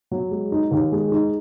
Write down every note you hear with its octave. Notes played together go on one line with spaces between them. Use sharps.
F#3
G#3
D#4
D#2
G#3
D#4